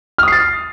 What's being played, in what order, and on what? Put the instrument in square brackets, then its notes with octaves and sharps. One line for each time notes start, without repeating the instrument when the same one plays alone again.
[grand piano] F6
D#6
C7
A6